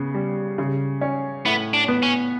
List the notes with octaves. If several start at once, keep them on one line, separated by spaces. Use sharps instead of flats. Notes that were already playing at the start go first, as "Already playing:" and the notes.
Already playing: C#3 B3
G3
C#3
C#4
A2 B3
D4
B3
C#4